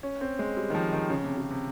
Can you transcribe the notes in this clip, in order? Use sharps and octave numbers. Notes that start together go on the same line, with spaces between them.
C#4
C4
G#3
G3
D#3
F3
D#3
C#3
C3
C#3
C3